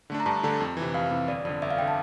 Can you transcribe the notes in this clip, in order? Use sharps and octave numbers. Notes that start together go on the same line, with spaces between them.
D3 A3 D4
A#5
G2 A5
D3 A3 D4
F2
E3
C3
F2 F5
C3 E3
G1 D5
F2 D3 D5
G1 E5
F5
G5
D3
A5